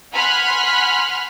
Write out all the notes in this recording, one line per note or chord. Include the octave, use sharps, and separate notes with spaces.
F#5 G#5 B5 C6 F6 F#6